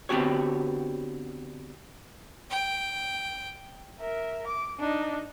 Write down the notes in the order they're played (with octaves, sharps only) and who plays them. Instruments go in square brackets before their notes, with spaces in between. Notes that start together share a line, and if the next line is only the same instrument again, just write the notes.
[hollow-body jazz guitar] D3 B3 C4 F#4 G4 C#5
[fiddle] G5
[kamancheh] A#4 E5
D6
D4 D#4